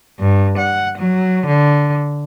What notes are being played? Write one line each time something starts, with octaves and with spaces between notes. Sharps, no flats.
G2
F#5
F#3
D3